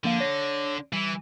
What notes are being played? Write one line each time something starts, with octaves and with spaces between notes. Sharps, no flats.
D3 F3 A#3 F5
C#5 A#6
E3 G3